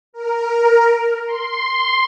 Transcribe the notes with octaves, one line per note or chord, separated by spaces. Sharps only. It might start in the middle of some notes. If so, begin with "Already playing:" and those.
A#4
C6